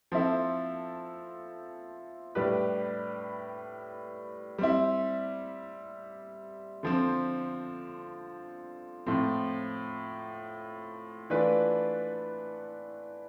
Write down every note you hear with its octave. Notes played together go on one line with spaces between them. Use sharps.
F3 C4 E4 A4
A2 G3 D4 G4 B4
G3 C4 E4
D3 F3 C4
A2 F3 C4
E3 A3 D4 F4 B4